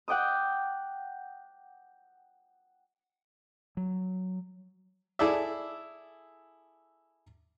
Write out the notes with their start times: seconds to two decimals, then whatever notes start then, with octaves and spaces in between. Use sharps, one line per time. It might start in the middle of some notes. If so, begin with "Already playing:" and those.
0.08 F#5 G5 D6 D#6
3.77 F#3
5.19 E4 G#4 A4 D5 E5